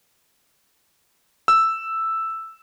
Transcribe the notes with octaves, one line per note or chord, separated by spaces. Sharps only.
E6